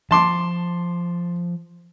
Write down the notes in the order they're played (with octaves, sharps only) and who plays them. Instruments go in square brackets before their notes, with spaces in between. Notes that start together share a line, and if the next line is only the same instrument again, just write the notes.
[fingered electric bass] F3 [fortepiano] A5 C6 D6